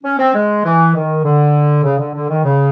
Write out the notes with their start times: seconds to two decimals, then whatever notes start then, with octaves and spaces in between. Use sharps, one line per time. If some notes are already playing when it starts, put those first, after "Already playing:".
0.04 C#4
0.19 C4
0.34 G#3
0.64 E3
0.94 D#3
1.24 D3
1.84 C#3
1.99 D3
2.14 D3
2.29 D#3
2.44 C#3